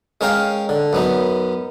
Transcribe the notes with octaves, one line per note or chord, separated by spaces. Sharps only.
G#3 C#4 A#4 F5 G5
D3
F#2 B3 D#4